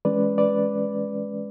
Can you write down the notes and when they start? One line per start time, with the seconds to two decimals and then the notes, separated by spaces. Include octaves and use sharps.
0.05 E3 G#3 C#4 B4 D5
0.38 B4 D5